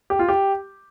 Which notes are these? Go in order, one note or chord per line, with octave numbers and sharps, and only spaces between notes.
G4
F4
G4